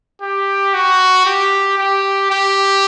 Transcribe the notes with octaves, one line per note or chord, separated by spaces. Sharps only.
G4
F#4
G4
G4
G4